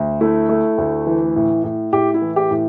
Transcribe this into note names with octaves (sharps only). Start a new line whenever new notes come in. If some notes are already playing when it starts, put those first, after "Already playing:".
Already playing: D2
A3 E4
A3
D2
E3
A2
A2
A2 G4
E4
E3
G4
A2